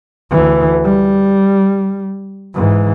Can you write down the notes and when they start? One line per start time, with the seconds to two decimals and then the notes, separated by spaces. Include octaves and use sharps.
0.31 D2 E3
0.84 G3
2.54 G#2 E3